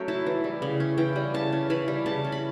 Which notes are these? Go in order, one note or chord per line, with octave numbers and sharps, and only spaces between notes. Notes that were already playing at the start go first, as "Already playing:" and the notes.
Already playing: F#3 A3 C#4 E5 G5
E4 A5
E3
G3
C#3
C#4
E3 G5
G3
C#3 A5
C#4
E3 B5
G3
C#3 A5
C#4
B5